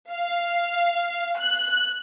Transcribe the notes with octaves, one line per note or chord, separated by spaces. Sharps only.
F5
F#6